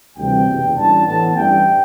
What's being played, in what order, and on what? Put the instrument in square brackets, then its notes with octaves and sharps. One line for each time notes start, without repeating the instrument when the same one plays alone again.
[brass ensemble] D2 C3 E3 G3 G5
F#1 E2 B2
A1 A2 G3 D4 A5
A2 E3 B3 A5
A1 G2 E3 G3 D4 G5